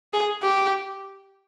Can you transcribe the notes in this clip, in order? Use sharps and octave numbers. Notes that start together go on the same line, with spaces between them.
G#4
G4